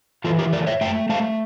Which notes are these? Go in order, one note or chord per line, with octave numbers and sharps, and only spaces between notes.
E3 F4 A4
G4 A#4
A3 A#4 D5
C#5 E5
A3 E5 G5
A3 F5 A5